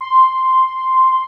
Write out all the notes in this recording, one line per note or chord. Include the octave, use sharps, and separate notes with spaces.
C6